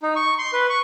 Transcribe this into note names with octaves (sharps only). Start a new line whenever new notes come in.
D#4
C#6
C6
B4
C#6